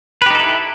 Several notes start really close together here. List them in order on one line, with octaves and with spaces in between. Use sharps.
B4 G4 D#4 A4 E4